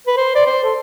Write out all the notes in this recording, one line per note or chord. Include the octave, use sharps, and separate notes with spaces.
B4
C5
D5
C5
A4